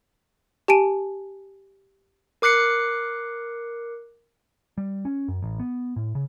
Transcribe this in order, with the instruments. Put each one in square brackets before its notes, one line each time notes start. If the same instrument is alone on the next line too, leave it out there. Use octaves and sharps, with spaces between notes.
[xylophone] G4 G#5 A5 D7 D#7
[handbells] A#4 D6 F#6 C7 C#7
[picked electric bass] G3
C#4
F#2
A1
B3
A2
C#3